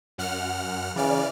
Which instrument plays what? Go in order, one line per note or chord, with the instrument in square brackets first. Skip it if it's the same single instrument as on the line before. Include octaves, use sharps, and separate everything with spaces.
[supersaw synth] F#2 F#5 F6
[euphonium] C#3 [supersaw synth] E3 D5 F6